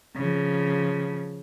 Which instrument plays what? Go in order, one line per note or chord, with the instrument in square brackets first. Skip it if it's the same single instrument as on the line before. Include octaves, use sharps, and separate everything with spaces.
[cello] C#3 F3